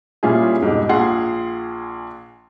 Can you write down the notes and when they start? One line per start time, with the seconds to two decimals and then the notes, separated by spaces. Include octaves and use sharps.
0.23 A#2 G3 C#4 E4 F4 G#4
0.62 F2 G#2 B2 G3 D6
0.89 A#1 F4 G#4 F#5 C6 C7